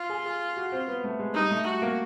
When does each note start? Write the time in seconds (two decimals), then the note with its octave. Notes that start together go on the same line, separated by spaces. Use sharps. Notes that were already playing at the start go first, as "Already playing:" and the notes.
Already playing: F4
0.10 G#4
0.25 G#4
0.57 F#4
0.72 C4
0.88 B3
1.04 A3
1.20 G#3
1.35 G3 D#4
1.51 A3
1.67 F#4
1.82 A#3